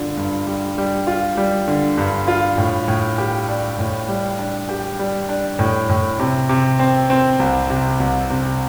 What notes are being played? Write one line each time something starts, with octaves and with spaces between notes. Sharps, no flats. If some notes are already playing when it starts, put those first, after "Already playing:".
Already playing: G2 D3 F4
G2
G3
G3
F4
G3
D3
G2
F4
A2
A2
G4
D4
A2
G3
D4
G4
G3
D4
A2
A2
C3
C3
C4
C4
C2
C3
C2
C3